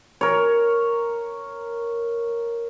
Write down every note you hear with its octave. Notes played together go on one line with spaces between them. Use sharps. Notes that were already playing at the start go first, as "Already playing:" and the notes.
A#4 C#5